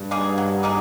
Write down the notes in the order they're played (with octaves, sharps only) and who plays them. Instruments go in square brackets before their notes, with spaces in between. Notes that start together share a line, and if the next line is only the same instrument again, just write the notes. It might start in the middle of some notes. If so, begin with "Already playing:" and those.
Already playing: [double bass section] G2
[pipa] A#3 D#4 G#4
F#3
A#3 D#4 G#4